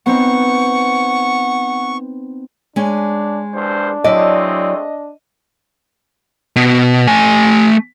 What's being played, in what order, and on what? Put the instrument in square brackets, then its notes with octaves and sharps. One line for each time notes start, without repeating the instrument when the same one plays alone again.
[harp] B3 C4 D#4 [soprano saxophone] F#5 [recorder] C#6
[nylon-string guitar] G#3 C#4 [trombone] D4
[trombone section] E2 G2 C5 [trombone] D4
[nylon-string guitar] F#3 E4 D5 [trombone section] G#3 A3 C4 [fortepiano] D#5
[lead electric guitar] B2
A3 G#5